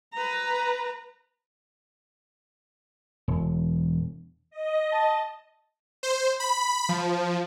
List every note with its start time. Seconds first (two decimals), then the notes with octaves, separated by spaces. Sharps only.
0.14 B4 A#5
3.28 E1
4.51 D#5
4.92 A5
6.03 C5
6.40 B5
6.89 F3